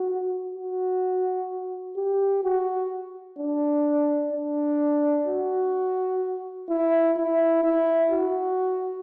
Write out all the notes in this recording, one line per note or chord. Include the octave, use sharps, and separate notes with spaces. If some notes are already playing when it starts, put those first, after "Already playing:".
Already playing: F#4
F#4
G4
F#4
D4
D4
F#4
E4
E4
E4
F#4